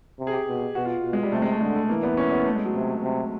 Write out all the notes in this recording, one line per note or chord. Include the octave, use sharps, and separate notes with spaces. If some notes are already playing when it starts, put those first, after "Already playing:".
C3
G#4
G4
B2
B2 F#4
F4
B2
G#3
G3
C3 A3
G#3
A3
D3 G#3
A3
E3 A#3
B3
C#4
B3
A3
G#3
F#3
C3
C3